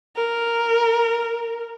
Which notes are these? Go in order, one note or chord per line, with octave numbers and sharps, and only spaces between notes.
A#4